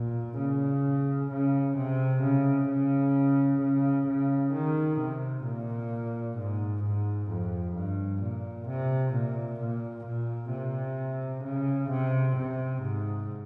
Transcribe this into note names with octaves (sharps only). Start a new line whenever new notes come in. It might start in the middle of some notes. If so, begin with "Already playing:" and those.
Already playing: A#2
C#3
C#3
C3
C#3
C#3
C#3
C#3
D#3
C3
A#2
G#2
G#2
F2
G2
A#2
C3
A#2
A#2
A#2
C3
C#3
C3
C3
G#2